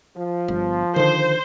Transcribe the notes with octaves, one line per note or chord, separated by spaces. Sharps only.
F3
G1
D3 D#3 C5